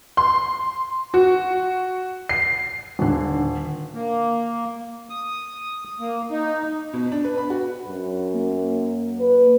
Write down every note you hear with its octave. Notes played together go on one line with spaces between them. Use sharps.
C6
F#4
C7
D#1 D3
A#3
D#6
A#3
D#4
B2
D4
B4
B5
F#4
F#2
A#3
B4